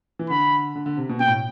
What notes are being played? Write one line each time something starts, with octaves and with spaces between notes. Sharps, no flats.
E3
D3 B5
D3
D3
C3
B2
B2 G5
A2